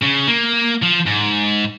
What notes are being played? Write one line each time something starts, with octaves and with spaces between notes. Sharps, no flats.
C#3
A#3
F3
G#2